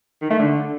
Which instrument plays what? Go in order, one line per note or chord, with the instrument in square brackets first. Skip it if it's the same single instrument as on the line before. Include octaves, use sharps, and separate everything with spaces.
[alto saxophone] D#3
A3
D3